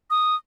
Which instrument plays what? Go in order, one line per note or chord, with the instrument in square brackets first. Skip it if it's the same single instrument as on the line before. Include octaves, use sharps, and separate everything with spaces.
[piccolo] D#6